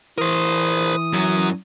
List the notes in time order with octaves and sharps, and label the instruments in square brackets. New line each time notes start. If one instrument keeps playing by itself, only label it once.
[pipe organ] E3 D#6 [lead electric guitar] A#4 C5
[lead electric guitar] F#2 F#3